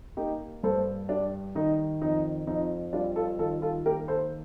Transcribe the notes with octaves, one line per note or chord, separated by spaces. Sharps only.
A#3 D#4 G4
G2 A4 C5
G3 D4
D#3 D#4
F2 D#4
F2 D#4
G3 D4 F4
F4 A4
D#3 F4 A4
F4 A4
A#3 G4 A#4
A4 C5